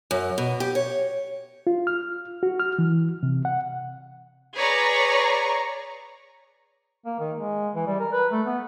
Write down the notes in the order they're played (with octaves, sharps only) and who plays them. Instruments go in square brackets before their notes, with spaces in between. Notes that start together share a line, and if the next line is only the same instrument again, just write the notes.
[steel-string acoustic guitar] F#2
B2
G4
C#5
[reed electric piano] F4
F6
F#4
F6
E3
C3
F#5
[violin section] G#4 B4 C#5 D5 A#5 C#6
[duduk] A#3
D#3
G#3
E3
G3
A#4
B4
A3
B3